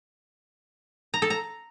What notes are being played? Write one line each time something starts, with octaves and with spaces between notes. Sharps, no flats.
A#5
A4
A#5